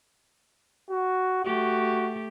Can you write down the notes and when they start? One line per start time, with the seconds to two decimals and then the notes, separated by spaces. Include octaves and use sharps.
0.91 F#4
1.45 A3 F#4 G4